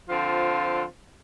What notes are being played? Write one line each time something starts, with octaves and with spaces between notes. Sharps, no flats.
D3 F3 C4 F4